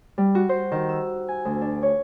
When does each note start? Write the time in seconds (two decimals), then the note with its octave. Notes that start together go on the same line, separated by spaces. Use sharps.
0.18 G3
0.35 F#4
0.49 C5
0.72 D#3
0.89 E6
1.28 G#5
1.45 D2
1.61 D4
1.83 C#5